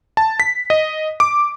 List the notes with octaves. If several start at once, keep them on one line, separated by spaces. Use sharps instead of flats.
A5
B6
D#5
D6